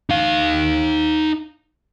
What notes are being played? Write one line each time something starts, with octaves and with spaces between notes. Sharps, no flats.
D#4 F5